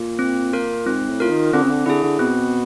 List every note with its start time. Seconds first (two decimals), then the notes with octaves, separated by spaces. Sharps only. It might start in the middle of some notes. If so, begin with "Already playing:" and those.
Already playing: A#2
0.19 C4
0.53 F4 A#4
0.86 G#2 C4
1.08 A2
1.20 F4 A#4
1.30 D#3
1.53 D3 C4
1.63 C#3
1.70 D3
1.86 D3 E4 G#4
2.04 D3
2.19 B2 C4